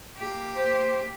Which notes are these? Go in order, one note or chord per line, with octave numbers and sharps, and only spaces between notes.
A#3 G4
C5